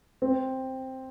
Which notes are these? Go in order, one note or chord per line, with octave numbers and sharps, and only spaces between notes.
C4